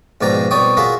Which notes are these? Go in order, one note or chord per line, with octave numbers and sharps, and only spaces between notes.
A#1 G#2 B2 D5 G5 A#5
C2 B2 C#5 D5 G5 D#6
F4 F#4 G#4 A#4 E5